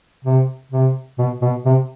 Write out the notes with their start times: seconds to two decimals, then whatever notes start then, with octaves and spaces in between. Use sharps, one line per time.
0.24 C3
0.72 C3
1.18 B2
1.42 B2
1.66 C3